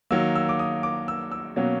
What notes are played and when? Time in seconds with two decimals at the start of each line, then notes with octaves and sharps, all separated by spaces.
0.11 D#3 F#3 A#3 E6
0.35 E6
0.49 D6
0.59 D#6
0.83 D6
1.08 E6
1.32 E6
1.56 B2 F#3 A#3 C#4